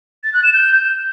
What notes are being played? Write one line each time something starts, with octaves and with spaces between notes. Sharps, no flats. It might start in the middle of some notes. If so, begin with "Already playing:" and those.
A6
F#6
E7
G6